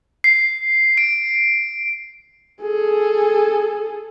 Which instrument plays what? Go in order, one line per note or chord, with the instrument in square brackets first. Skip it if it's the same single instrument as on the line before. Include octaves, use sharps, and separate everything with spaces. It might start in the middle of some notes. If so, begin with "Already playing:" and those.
[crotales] C7
D7
[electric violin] G#4 A4